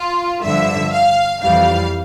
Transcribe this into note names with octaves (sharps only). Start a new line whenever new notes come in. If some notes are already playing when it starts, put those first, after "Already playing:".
Already playing: F4
G2 D3 F3 E5
F5
F2 E3 G3 F5